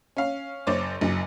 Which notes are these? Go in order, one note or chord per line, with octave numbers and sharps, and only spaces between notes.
C#4 F5
F#1 C5 C#5 D6 A6
F#1 F#2